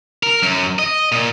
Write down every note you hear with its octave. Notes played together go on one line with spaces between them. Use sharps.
A#4
F#2
D#5
A#2